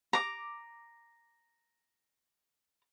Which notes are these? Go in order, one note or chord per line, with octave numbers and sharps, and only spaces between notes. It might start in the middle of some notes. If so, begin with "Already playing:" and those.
A#5 D6